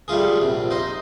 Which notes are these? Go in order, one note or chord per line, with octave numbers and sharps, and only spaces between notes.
G3 A3 F4 G#4
A#1 C3
D#4 C5